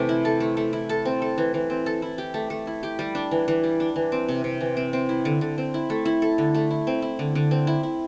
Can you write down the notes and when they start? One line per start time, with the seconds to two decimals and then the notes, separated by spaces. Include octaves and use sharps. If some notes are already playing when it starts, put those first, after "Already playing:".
Already playing: C3 E3 A3
0.09 E4
0.25 A4
0.40 A3
0.57 A3
0.73 E4
0.89 A4
1.05 C4
1.22 A4
1.38 E3
1.54 E3
1.70 C4
1.86 A4
2.02 E4
2.18 G4
2.34 A3
2.50 A3
2.67 E4
2.83 G4
2.99 G3
3.15 D4
3.31 E3
3.48 E3
3.63 G3
3.80 D4
3.96 E3
4.12 C4
4.29 C3
4.44 C3
4.61 E3
4.77 C4
4.93 C4
5.09 E4
5.25 D3
5.41 D3
5.58 C4
5.74 E4
5.90 A3
6.05 E4
6.22 A4
6.38 D3
6.55 A3
6.70 E4
6.87 C4
7.02 E4
7.19 D3
7.35 D3
7.51 C4
7.67 E4
7.83 E4